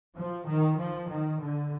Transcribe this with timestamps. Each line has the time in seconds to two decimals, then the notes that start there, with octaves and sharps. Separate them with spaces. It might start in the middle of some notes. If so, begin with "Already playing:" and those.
0.15 F3
0.47 D#3
0.77 F3
1.08 D#3
1.40 D3